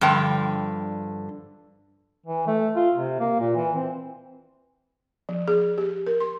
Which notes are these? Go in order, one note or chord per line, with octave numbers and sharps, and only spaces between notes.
G2 D3 F3 G5
E3
A3
F4
C3
A#3
A#2
E3
C4
F3
G#4
G4
A#4
C6